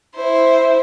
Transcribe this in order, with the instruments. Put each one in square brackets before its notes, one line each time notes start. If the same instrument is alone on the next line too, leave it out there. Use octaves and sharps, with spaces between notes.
[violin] E4 C5